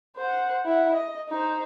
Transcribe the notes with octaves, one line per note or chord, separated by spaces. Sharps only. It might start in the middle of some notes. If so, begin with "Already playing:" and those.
C5 F#5
E4 F#5
D#5
D#4 C5